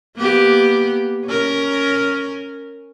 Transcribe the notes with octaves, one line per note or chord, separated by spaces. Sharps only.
A#3 B3 G4
C#4 A#4